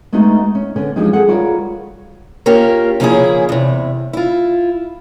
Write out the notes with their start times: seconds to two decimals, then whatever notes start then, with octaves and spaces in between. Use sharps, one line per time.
0.12 G#3 A3 B3 D4 D#4 F#4
0.55 C#4
0.76 D3 B3 C#4
0.96 E3 F3 G3 G#3 D4 D#4
1.13 G#4 A4 F#5
1.28 G3 F4 F#4 A#4 C#5 F5
2.46 A#3 C#4 F4 G4 A#4
3.00 C#3 F3 A#3 C#4 E4 G#4
3.49 E2 C3
4.13 E4 F4